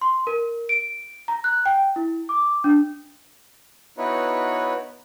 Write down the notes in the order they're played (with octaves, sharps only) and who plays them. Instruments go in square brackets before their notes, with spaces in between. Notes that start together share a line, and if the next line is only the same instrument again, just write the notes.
[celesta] C6
A#4
D7
A#5
F#6
G5
E4
D6
D4
[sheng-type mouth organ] B3 D#4 E4 F#4 B4 C#5